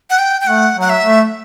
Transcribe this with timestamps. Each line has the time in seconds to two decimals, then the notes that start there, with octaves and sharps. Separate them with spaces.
0.10 F#5
0.19 G5
0.41 G5
0.47 A3 F#5
0.76 F#3
0.81 F#5
0.90 E5
1.03 A3